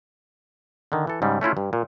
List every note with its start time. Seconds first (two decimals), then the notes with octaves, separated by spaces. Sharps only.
0.92 D3 D#3
1.07 E3 A4
1.22 G#2 C#3 G3
1.41 A3 C#4 E4 F4
1.57 G2
1.73 A#2